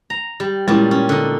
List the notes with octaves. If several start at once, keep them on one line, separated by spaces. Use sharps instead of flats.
A#5
G3
A#2 G3 G#3 C#4 E4
C#4
D3 D#4